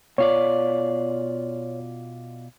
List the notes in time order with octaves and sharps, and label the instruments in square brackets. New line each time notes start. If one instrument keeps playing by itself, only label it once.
[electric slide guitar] B2 F4 D5 [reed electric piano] C#5